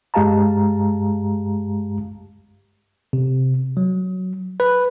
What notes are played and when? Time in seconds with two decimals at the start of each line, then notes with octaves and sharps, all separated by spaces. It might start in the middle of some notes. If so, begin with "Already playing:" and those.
0.14 G2 G#3 G4 F5 A5 A#5
3.13 C3
3.77 F#3
4.60 B4